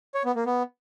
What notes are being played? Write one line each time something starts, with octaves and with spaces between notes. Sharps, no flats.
C#5
B3
A#3
B3